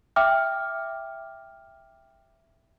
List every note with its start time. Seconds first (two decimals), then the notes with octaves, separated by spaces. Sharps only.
0.16 E5 G5 D6 F6